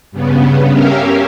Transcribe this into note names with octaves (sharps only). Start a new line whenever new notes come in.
G2 C#3 B3
C#4 G4 A#4 E5 F5